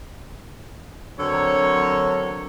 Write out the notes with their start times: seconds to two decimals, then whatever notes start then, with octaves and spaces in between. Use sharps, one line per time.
1.19 D3 F#3 C4 A4 A#4 C#5